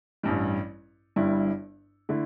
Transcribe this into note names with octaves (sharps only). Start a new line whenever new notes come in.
A1 G2 G3
G1 G2 G3 E4
D3 A3 E4